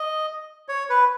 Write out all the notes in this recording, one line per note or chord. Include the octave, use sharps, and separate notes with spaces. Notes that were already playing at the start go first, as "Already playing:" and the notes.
Already playing: D#5
C#5
B4